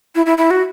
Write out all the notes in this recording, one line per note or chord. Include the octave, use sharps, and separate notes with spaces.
E4
E4
E4
F#4